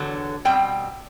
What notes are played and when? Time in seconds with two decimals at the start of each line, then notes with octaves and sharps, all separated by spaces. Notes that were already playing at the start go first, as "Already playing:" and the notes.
Already playing: E2 D3 F#3
0.45 B2 G3 C4 G5